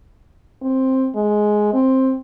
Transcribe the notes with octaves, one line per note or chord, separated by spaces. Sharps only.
C4
G#3
C4